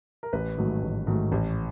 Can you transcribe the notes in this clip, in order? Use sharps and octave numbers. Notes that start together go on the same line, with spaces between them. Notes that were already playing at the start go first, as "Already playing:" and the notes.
A#4
A1 B4
G#2 D#3 F#3 A3
A1
G#2 D#3 F#3 A3
A1